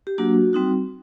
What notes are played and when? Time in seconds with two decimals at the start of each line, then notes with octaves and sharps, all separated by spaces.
0.07 G4
0.18 F#3 A#3 D4 F#4
0.53 G3 C4 D#4 F#4